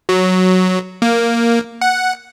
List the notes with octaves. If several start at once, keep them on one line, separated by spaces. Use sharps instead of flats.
F#3
A#3
F#5